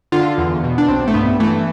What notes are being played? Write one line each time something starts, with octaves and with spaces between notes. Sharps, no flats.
D3 F4
E2
B2
D4
B1 C4
A3
G2 B3
E3 A3